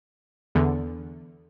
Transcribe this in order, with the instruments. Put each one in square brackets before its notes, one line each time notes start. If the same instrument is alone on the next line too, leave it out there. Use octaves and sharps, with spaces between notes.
[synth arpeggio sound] E2 D3